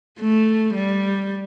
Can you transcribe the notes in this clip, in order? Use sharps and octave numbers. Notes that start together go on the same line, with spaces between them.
A3
G3